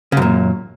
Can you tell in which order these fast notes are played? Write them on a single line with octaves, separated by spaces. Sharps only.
C#3 F#2 A#2